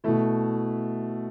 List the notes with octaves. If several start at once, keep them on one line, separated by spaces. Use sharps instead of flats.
B2 A3 E4